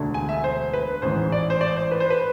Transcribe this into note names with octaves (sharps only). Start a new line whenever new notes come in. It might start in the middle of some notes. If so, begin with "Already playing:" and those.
Already playing: E1 D2 D3 A3
G#5
E5
C5
B4
A1 G#2 E3 C5
D5
C5
D5
C5
B4
C5
B4